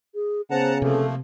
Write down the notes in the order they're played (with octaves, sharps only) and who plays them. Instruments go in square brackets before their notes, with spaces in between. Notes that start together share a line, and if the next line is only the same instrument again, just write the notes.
[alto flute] G#4
[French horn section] C#3 B3 [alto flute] C5 [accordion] F#5 A5 A#5
[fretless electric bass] C3 [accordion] F3 A3 A#3 [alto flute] A4